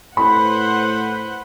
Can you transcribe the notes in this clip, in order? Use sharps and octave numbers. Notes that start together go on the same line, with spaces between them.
A2 B4 C5 F#5 B5